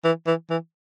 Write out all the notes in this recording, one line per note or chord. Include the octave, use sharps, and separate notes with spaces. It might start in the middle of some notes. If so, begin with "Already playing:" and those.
E3
E3
E3